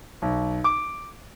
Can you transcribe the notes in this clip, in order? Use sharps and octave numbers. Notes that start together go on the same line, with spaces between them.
B1
D6